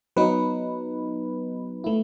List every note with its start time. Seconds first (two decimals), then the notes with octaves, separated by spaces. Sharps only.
0.16 F#3 B3 D#4 B4
1.84 A3 E4